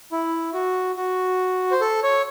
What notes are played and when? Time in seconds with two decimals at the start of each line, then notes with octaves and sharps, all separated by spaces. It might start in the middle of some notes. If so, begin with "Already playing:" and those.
0.12 E4
0.53 F#4
0.97 F#4
1.71 C5
1.81 A4
2.03 C#5